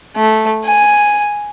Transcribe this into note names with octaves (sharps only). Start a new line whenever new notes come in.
A3
G#5